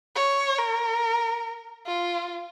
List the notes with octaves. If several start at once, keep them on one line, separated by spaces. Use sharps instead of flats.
C#5
A#4
F4